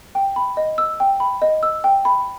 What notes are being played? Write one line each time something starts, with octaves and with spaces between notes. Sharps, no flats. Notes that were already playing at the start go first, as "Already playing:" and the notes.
G5
B5
D#5
E6
G5
B5
D#5
E6
G5
B5